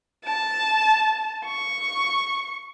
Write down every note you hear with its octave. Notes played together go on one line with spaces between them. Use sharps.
A5
C#6